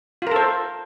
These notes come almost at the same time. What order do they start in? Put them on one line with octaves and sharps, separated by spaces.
F4 A#4 A4 C5